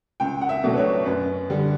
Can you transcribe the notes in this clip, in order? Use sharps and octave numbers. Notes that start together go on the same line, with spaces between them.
C#2 G5
F#5
E5
B2 F#3 A3 D4
B4
C#5
F#2 B4
D3 G3